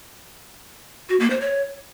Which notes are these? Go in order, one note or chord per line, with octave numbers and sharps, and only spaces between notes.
F#4
A#3
C5
C#5